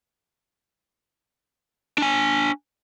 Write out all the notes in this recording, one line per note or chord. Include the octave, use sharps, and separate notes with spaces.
D4 G#5